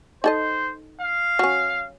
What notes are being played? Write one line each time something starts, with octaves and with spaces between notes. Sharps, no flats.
D#4 A4 C5 D#5
F5
F#3 C#4